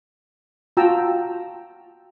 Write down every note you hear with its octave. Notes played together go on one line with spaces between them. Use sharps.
F4 F#4 G5 A5 A#5 E6